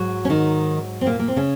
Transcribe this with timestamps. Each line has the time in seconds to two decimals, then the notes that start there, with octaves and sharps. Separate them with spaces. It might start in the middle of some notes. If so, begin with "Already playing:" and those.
Already playing: G#2 F#3 F#4
0.25 C#4
0.30 D#3 D#4
1.01 C4
1.06 A#2 A#3
1.19 A#3
1.28 C4
1.36 C#3 C#4